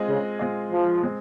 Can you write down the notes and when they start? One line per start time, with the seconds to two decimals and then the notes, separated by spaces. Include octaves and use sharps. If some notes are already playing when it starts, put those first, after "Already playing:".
Already playing: G#3 C4 F4 G#4 D#5
0.09 C#3
0.39 G#3 C4 F4 G#4 D#5
0.72 F3
1.04 G#3 C4